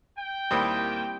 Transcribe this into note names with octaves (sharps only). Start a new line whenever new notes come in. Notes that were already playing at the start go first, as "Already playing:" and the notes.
G5
D#2 G3 A#3 C4 E4 D#6